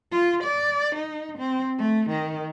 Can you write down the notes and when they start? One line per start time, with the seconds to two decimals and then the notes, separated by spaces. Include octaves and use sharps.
0.11 F4
0.43 D5
0.95 D#4
1.38 C4
1.78 A3
2.09 D#3